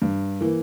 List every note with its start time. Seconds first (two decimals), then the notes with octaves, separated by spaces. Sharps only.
0.02 G2
0.41 E3 A#3